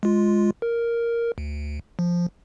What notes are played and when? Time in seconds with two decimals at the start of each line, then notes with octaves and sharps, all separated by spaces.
0.03 G#3 F4
0.62 A#4
1.38 D2
1.99 F3